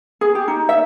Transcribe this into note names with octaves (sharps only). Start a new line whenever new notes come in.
G#4
G4
D#4
E5